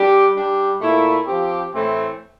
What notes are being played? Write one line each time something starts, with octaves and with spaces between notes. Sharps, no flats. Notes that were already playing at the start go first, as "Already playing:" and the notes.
Already playing: G3 D4 G4
G3 D4 G4
A#2 A3 E4
F3 C4 G4
A2 E3 A3 C4